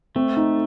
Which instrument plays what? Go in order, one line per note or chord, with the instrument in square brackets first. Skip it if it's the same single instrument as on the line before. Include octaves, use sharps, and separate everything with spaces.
[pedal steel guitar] A3 [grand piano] C4
[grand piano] D#4